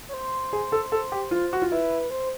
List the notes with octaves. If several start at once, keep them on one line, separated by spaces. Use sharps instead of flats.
C#5
C5
G#4
A4
A4
G4
F4
F#4
F4
E4 B4
C5